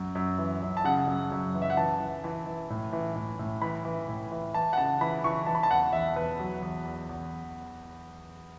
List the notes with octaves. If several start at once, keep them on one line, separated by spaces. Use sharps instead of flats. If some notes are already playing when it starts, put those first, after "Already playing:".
Already playing: F#2
F#2
E3
F#2
A5
C#3 F#5
F#2
F#2
E3
E5
F#5
E3 A5
E3
E3
E3
A2
E3
A2
A2
E3 B5
E3
A2
E3
E3 A5
F#5
C#3 A5
E3 B5
E3 C#6
E3 A5
B5
A5
E2 F#5
E2 E5
E2 B4
F#3
E2
E2
E2